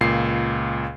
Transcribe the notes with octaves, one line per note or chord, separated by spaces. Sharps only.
C#2 A#2 C7